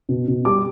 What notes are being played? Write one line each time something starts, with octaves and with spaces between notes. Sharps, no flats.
B2
B2
G3 D6